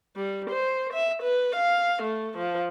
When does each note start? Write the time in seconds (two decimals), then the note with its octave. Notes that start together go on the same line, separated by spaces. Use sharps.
0.16 G3
0.50 C5
0.93 E5
1.22 B4
1.56 F5
2.03 A3
2.38 F3